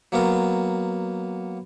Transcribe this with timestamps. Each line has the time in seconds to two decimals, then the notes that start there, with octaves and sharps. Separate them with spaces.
0.12 F#3 A#3 B3 A#4